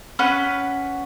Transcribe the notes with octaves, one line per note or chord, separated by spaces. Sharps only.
C#4 B4 F#5